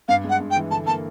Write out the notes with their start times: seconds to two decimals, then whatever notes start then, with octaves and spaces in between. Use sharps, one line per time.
0.08 G2 F5
0.24 G#3
0.29 F#5
0.40 G2
0.51 G5
0.56 E3
0.71 D3 A5
0.87 A#3 A5